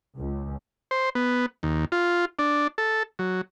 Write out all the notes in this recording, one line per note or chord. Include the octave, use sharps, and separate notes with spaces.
C#2
C5
B3
D#2
F4
D4
A4
F#3